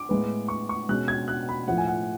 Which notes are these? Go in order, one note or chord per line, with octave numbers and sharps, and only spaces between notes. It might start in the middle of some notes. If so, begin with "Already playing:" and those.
Already playing: D6
A2 G#3 B3
C#6
C#6
B2 G#3 C#4 F#6
G#6
F#6
B5
A2 F3 A3 F#5
G#5
F#5